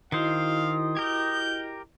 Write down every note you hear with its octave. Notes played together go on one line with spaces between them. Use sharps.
D#3 E4 F#4 C5 D#5 F5 D#6
G4 A#4 G6